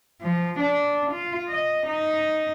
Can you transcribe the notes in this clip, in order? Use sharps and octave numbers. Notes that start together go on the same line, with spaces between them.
F3
D4
F4
D#5
D#4